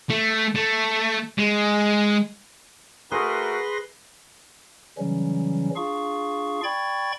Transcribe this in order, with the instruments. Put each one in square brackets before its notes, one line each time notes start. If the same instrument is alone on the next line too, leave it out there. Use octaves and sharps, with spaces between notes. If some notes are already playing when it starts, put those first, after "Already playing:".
[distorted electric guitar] A3
A3
G#3
[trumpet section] A3 F#4 A#4 [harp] G#4 D#7 [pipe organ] B4 C6 A#6
[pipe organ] C#3 E3 F#3 G3 C#4
D4 F4 G#4 F5 C#6
D5 G5 B5 C#6 G#6 A6